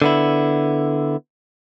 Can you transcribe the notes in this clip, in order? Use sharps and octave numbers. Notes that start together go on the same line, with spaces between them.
D3 B3 E4